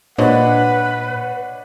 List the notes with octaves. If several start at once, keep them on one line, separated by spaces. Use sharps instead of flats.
A#2 D4 B4 C#5 D#5 F#5